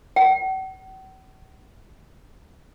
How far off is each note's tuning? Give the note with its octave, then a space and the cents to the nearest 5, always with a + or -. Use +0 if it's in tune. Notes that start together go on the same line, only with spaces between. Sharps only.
F#5 +45